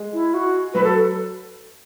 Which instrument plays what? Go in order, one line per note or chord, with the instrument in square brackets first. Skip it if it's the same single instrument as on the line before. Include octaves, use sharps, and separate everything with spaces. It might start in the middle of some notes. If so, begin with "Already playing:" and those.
Already playing: [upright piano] G#3
[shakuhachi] E4
F#4
[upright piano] F#3 [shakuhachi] B4
[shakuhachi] A4